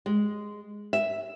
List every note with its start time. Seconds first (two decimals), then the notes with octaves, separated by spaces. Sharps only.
0.06 G#3
0.93 E5